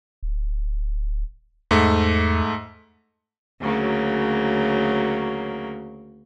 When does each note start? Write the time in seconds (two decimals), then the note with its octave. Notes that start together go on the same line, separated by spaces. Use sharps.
0.23 D1
1.71 E2 G#2 A3
3.61 D2 C#3 F#3 A#3